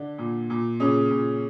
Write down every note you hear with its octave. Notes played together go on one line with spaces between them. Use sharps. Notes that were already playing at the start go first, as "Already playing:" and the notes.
Already playing: D3 D4
A#2
A#2
A#2 C#3 C#4
A#2